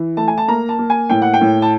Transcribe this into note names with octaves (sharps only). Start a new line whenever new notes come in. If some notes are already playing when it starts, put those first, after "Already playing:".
Already playing: E3
A3 A5
G#5
A5
A#3 A#5
A5
A#3
G#5
A2 G5
F#5
G5
A2
A5